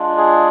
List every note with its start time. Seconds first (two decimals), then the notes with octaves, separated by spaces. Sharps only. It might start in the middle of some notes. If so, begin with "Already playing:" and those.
Already playing: G#3 D4 F4
0.18 G#4